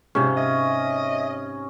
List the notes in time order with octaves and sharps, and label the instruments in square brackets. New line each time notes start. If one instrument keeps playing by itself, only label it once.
[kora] G#2 C3 F4 [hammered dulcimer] C#4
[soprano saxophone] D#5 [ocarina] E5